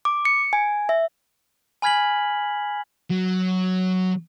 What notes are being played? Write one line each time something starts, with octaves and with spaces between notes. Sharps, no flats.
D6
C#7
G#5
E5
G#5 B5 F6 G#6 B6 F#7
F#3